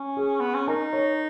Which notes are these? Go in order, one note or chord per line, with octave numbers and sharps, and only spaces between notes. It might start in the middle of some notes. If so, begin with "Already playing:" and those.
Already playing: C#4
G#4
B3
C#4
D#4 A#4
C#5